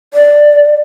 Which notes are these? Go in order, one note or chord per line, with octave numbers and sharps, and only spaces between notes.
D5